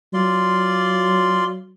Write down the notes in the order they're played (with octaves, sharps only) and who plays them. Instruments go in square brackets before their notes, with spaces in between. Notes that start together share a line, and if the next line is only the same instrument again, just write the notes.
[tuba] F#3 [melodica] F4 D5 C6